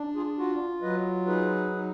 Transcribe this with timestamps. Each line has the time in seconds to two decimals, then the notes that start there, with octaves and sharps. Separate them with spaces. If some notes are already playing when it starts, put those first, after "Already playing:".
Already playing: D4
0.15 F4 G#4
0.38 F4 F#4
0.82 F#3 B4 D#5
1.27 D#4 G#4 B4
1.72 D#4